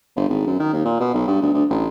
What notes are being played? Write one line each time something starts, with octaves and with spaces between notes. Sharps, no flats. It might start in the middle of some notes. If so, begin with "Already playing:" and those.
G1
G#1
F#2
D#3
D#2
A#2
B2
B1
G2
D2
D2
A1